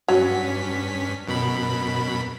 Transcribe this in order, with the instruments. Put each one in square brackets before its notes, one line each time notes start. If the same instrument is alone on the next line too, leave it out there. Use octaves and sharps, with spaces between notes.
[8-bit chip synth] G2 C#4 B6 [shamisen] F#3
[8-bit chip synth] F#2 B2 B5